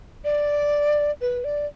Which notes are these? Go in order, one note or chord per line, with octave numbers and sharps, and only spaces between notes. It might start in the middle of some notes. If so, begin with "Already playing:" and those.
D5
B4
D5